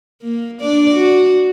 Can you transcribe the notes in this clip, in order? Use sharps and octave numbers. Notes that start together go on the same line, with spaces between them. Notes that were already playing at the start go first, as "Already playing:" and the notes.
A#3
D4 D5
F#4